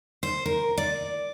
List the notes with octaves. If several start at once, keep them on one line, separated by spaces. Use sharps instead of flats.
C5
A#4
D5